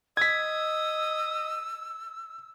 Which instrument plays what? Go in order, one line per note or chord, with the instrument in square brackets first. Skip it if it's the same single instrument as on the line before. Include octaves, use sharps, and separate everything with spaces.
[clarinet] D#5 [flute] E6 [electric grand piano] G#6 B6